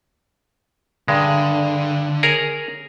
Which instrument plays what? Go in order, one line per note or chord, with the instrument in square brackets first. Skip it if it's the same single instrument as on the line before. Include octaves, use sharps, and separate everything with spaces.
[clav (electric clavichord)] G2 G#3 [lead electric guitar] D3
[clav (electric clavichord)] G#4 A#4 C#5